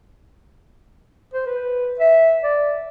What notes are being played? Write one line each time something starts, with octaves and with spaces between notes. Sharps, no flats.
C5
B4
E5
D5